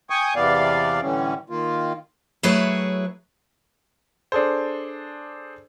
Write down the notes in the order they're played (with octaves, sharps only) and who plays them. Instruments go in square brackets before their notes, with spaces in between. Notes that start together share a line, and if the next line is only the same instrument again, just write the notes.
[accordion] G5 G#5 C#6 D#6
E2 C3 E3 B3 D5 F5
A2 D3 E3 G3 C#4
D#3 A#3 F4
[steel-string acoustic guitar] F#3 A3 E4 G#4 B4 C#5
[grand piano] D4 G#4 A4 C5